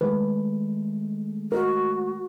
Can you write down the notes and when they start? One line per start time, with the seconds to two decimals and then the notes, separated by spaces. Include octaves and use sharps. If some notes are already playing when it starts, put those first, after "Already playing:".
0.01 D#3 G#3 A3 B4
1.52 F#4 A#4